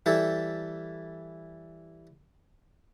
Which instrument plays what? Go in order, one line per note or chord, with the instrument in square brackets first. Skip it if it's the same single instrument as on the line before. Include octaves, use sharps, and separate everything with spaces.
[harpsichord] E3 G3 E4 A4